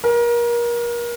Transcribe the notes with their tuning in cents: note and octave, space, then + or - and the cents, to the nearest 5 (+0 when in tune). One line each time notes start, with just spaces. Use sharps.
A#4 +30